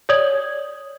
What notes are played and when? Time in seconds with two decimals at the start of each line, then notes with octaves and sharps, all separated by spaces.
0.09 C#5 D5 D#6 G#6 F#7